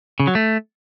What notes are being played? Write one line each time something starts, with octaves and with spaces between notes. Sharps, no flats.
C#3
F#3
A3